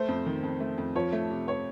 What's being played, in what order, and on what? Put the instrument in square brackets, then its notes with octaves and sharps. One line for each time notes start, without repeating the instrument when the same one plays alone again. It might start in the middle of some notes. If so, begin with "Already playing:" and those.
Already playing: [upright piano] A3 [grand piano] C5
[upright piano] F2
D#3
F2
A3
F2
[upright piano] F3 [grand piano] C#5
[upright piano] A3
C3
[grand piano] C#5